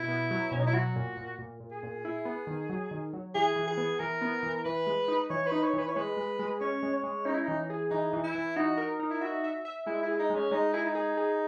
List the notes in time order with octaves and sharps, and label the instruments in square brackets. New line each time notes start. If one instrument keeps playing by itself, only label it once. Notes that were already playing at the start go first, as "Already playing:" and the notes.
Already playing: [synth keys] B2 [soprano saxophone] E4
[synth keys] B3
F#3
[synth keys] B2 [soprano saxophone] C#4
[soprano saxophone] D#4
E4
[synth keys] F#3 [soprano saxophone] F#4
[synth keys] A#2
A#2
A#2
A#2
[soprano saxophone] G#4
[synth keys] A#2
E4
B3
D#3
F#3
D#3
F#3
[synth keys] E3 [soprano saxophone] G#4
[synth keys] E3
[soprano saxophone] G#4
[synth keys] B3
[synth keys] E3 [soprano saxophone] A#4
[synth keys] B3
E3
[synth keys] E3 [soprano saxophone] B4
[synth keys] G#3
D#4
[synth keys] E3 [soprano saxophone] C#5
[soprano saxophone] B4
[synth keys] D#4
[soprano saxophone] C#5
[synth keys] E3
[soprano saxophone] B4
C#5
[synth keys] G#3 [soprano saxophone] B4
[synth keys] G#3
G#3
[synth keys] C#4 [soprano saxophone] C#5
[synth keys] G#3
[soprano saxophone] C#5
[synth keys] G#3
[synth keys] C#4 [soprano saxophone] D#4
[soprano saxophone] E4
[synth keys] E3 [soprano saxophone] D#4
[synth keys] G#4
[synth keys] E3 [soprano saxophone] D#4
[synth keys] E3
[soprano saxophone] E4
[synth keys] E3
[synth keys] D#4 [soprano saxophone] F#4
[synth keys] A#4
D#4
[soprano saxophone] E4
[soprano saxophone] F#4 [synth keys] E5
[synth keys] E5
E5
[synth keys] G#3 [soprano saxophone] E4
[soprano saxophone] E4
[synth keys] G#4
[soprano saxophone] D#4
[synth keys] G#3
[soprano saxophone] C#4
[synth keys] G#3 [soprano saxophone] D#4
[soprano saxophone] E4 [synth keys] G#4
[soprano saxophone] D#4
[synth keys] G#4
G#4